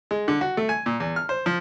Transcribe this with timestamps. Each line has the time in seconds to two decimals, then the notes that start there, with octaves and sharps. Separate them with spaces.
0.11 G#3
0.28 D3
0.41 F#4
0.57 A3
0.69 G#5
0.86 A#2
1.00 E2
1.16 F6
1.29 C5
1.46 F3